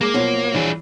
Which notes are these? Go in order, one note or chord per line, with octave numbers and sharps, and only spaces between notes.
G#3 A#3 D6
B2 F3 F#3 F#4
E3 D4 G#4